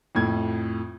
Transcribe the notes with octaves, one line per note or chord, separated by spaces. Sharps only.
F2 A2 G#6